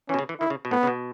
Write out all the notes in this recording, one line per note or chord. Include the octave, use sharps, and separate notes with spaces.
E3 C#4
B2
C#3
E3
D#3 E4
C#3
B2
A2 B3
C#3
B2